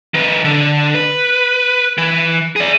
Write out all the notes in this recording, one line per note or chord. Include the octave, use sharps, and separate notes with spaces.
D#3 B4
D3
B4
E3
G#4 D5